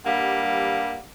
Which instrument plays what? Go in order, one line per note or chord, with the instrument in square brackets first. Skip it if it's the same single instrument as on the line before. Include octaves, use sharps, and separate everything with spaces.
[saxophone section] G2 G3 A#3 [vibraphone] F5 F#5